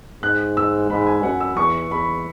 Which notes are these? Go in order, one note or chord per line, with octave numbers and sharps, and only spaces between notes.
G#2 F#6
E6
G#2 B5
G#5
F#2 F#5
E6
E2 C#6
E2 B5